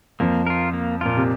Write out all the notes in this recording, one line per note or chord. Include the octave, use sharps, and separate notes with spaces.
F2 F3 A#3
F4 A#4
A#3
A#2 F4 A#4
C3